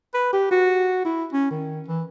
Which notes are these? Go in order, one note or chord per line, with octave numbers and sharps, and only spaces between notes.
B4
G4
F#4
E4
C#4
D#3
E3